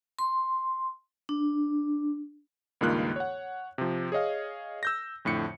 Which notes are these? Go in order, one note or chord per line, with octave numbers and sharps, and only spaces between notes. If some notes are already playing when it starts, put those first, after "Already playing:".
C6
D4
C#2 G2 D#3 A#3 F4 F#6
C#5 F#5
C3 F3
G#4 C#5 D#5 F5
E6 G6 A#6
F2 A2 D3 C#7